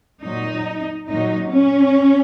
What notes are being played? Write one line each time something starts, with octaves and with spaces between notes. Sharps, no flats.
A#2 F#3 D#4
A#2 F#3 D#4
C#4